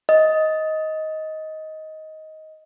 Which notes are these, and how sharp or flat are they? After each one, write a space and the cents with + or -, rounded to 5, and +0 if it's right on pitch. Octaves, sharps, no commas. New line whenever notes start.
D#5 +15